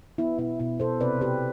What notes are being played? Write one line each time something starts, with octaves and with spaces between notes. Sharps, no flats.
B3 E4
B2 E4
B2 E4
B2 A4 C5
C3 B4 D5
C3 G4 B4